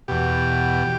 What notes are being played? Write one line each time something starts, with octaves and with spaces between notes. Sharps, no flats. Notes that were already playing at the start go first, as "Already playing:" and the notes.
E2 B2 G4